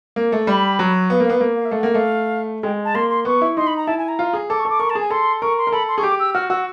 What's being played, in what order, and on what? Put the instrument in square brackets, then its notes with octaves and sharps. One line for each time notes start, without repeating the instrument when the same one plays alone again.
[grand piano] A#3
A3
[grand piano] G3 [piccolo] B5
[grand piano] F#3
[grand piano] B3 [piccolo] F5
[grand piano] A#3
[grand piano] B3 [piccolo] F5
[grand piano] A#3
[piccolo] F5
E5
[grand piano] A3 [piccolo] F5
[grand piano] A#3 [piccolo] F#5
[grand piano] A3 [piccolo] F5
[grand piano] G#3 [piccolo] G5
[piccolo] A5
[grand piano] A#3 [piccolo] C6
[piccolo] C6
[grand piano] B3 [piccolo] C#6
[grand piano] E4
[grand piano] D#4 [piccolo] C6
[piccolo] B5
A#5
[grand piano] E4 [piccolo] A5
[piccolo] G#5
A#5
[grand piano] F4
G#4
[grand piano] A4 [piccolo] D6
[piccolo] C#6
[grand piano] A4
[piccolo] D6
[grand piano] A#4 [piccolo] C#6
[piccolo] A5
[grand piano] G#4
[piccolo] G#5
[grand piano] A4 [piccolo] C6
[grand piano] A#4 [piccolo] C#6
[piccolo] C6
[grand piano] A#4
[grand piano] A4 [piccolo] B5
[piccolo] C6
[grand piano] G#4 [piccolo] C#6
[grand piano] G4 [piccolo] D6
[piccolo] E6
[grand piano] F#4 [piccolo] F6
[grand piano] F#4 [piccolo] E6